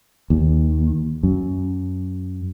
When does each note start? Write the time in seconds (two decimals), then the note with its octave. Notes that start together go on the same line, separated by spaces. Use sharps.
0.30 D#2
1.23 F#2